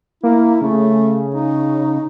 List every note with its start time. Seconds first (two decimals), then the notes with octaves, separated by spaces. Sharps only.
0.23 A#3 E4
0.61 C#3 A3
1.35 D#4